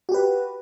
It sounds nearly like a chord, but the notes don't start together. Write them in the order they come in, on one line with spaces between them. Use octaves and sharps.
F#4 G4 B4